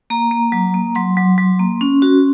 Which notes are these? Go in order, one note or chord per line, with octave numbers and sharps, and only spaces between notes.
A#3 A#5
A#3
F#3
A#3
F#3 C6
F#3
F#3
A#3
C#4
F#4